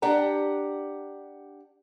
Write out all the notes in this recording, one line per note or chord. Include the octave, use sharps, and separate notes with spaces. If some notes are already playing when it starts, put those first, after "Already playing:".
D4 G4 F#5 A#5